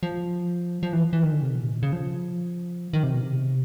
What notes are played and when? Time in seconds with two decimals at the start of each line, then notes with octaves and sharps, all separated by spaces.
0.03 F3
0.83 F3
0.93 E3
1.13 E3
1.23 D#3
1.33 D3
1.43 C3
1.53 B2
1.63 A#2
1.83 C#3
1.93 F3
2.93 D#3
3.03 C3
3.14 B2
3.23 C3